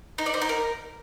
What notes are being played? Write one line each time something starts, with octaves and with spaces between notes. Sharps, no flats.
D#4
D5
C5
D#4
A#4